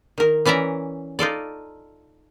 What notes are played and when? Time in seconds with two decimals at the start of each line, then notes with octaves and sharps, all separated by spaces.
0.18 D#3 A#4
0.45 E3 C#4 D5 E5 A#5
1.19 D#4 F4 A4 D5